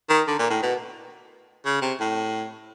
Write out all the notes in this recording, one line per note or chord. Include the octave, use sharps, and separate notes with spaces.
D#3
D3
A#2
A2
B2
C#3
C3
A2